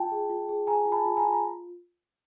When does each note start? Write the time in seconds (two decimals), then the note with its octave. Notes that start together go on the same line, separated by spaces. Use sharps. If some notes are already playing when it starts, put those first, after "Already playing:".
Already playing: F4 G5 A5
0.11 G#4
0.30 F4
0.49 G#4
0.67 G#4 G#5 A#5
0.86 F4
0.92 A5 B5
1.05 F4
1.16 G#5 A#5
1.23 F4
1.33 A#5